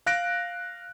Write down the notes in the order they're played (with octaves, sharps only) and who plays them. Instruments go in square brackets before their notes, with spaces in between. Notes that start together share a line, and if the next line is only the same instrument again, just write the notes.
[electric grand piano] F5 F#6 A#6 D7